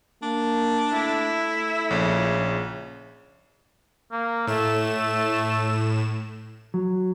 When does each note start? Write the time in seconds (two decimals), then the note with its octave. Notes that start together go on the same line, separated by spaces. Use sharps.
0.22 A#3 D4
0.92 A3 E4
1.91 A#1 C#3
4.12 A#3
4.47 A2 A3 E7
6.74 F#3